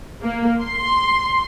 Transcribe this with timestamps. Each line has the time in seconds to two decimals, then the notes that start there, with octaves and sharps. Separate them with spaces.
0.22 A#3
0.60 C6